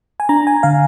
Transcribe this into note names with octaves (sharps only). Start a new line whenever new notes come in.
G#5
D4 A#5
G#5
D3 F5